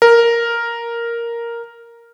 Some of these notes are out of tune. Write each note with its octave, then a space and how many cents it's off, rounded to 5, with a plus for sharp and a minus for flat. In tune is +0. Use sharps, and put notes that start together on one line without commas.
A#4 +0